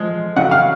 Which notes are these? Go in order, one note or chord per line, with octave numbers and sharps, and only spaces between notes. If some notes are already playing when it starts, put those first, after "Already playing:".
Already playing: F3 G#3
C#3 F#3 F#5
F5